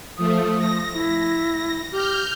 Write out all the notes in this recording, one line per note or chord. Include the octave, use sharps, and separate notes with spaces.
F3 A3 D#6
A#6
E4
G4 F6 G6